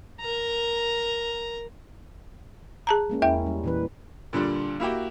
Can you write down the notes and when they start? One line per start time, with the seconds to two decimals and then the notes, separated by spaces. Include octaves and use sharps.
0.21 A#4 A#5
2.87 G#4 A5 A#5
3.09 G#3 A#3 C#4
3.22 E2 E4 E5 G5
3.46 G3
3.64 A#2 E3 B4
4.33 A#2 D3 G3 D4
4.80 A#3 E4 F#4 G4